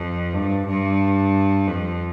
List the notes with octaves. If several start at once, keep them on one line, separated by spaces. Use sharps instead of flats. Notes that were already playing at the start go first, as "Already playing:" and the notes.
Already playing: F2
G2
G2
F2